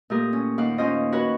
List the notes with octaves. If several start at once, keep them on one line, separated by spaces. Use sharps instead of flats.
A#2 A3 G4 A#4 D#6
C#4
D#2 F5 F#5 D6
D#2 C#4 F4 C5 D#5
F#4 A#4 B4 C#5 F#5